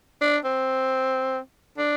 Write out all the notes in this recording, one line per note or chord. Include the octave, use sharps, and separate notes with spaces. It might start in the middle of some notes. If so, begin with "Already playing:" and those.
D4
C4
D4